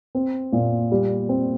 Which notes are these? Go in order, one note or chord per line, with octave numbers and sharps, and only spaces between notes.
C4
A#2
G3
C4